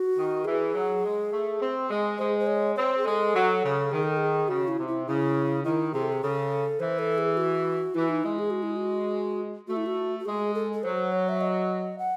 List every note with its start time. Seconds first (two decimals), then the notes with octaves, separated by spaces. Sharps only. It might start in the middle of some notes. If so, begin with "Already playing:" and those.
Already playing: F#4
0.16 D#3
0.45 E3 G#4
0.75 F#3
1.03 G#3
1.32 A3
1.60 C4
1.90 G#3
2.18 G#3 C5
2.40 C5
2.47 C#5
2.76 C4 C#5
2.98 G#4
3.04 G#3 A4
3.34 F#3
3.63 C#3
3.91 D#3 G#4
4.03 A4
4.17 G#4
4.48 C#3 F#4
4.68 E4
4.78 C3
4.88 E4
5.07 C#3 E4
5.64 D#3 E4
5.93 C3 G#4
6.02 A4
6.12 G#4
6.22 C#3 A4
6.80 E3 C5
6.99 A4
7.18 G#4
7.37 F#4
7.95 E3 E4
8.09 D#4
8.24 G#3 E4
8.39 G#4
8.50 F#4
8.63 E4
8.76 F#4
9.68 A3 F#4
9.77 E4
9.86 F#4
10.19 F#4
10.25 G#3 G#4
10.54 A4
10.73 A4
10.83 F#3 C5
11.12 C#5
11.29 E5
11.41 D#5
11.98 F#5